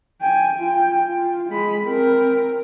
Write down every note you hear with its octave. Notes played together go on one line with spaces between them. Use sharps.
G5 G#5
F4 G5
F4
G#3 B5
C4 A#4